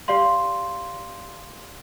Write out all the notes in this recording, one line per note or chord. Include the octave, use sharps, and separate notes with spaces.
G4 D5 F5 C6